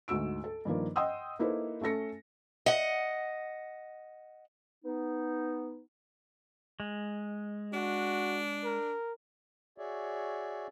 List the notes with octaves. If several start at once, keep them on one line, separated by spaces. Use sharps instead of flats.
D2 G#2 F#4 E6 D7
A4
G2 D#3 F3 A#3
D#5 F#5 G5 C6 D#6 E6
A#3 D#4 E4 A4 B4 C5
A3 C#4 A4 A#6 C#7
D#5 F#5
B3 D#4
G#3
D4 F#4
A#4
F#4 G#4 C#5 D5 E5